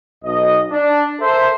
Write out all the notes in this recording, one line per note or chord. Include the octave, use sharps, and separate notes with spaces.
B1 D#5
D4
A4 A#4 C5 E5